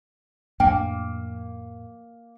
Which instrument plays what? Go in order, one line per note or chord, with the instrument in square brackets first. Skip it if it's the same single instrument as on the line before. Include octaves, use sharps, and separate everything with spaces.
[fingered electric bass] F2 A2 D4 [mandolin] A#3 [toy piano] G5